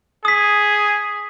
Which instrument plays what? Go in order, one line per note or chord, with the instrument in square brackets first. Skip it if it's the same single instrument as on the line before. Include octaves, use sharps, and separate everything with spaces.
[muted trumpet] G#4 [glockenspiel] D#6 B6